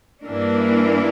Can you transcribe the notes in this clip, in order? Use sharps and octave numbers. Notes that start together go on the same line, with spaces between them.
G2 E3 A#3 D4